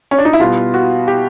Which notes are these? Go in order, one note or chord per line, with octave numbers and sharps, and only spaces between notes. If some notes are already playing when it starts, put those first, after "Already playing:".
C#4
D4
D#4
E4
B2 G3 B3 F4
F#4
G4